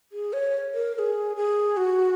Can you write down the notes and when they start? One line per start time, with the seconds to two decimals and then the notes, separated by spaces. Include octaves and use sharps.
0.12 G#4
0.33 C#5
0.74 A#4
0.94 A#4
0.99 G#4
1.36 G#4
1.77 F#4